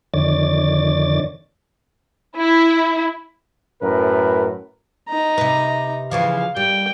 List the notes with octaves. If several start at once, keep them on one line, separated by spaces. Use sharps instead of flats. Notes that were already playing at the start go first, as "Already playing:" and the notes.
F2 D3 D#3 C#5 D5 A6
E4
F#2 A2 A#4 B4
D#4 A#5
C3 B4
C#3 E3 F3 F5
G3 G5